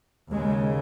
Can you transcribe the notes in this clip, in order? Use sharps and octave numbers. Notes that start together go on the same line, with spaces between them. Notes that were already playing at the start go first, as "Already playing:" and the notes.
D#2 C#3 G#3